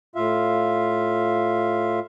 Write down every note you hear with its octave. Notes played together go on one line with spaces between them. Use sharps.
A2 F4 E5 F5